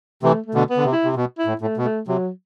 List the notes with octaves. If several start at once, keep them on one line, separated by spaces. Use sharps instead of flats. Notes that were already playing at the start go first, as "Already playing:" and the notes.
C3 E3 A3
A3
B2 D3
B3
D3
C3
E4
C3
B2
E4
A2
A2 A3
B2
A3
C3 F#3